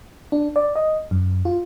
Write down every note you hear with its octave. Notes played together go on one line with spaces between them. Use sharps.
D4
D5
D#5
F#2
F4